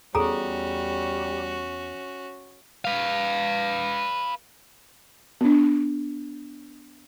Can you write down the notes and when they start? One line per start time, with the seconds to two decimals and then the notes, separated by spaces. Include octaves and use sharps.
0.15 E2 G3 C#4 F#4 G#4 A4 A#5
2.85 B4 F5
5.41 B3 D4